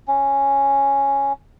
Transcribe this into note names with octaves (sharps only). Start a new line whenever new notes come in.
C#4